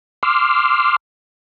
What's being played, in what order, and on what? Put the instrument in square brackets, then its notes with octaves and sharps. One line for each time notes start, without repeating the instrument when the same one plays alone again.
[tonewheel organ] C6 D6 E6 F6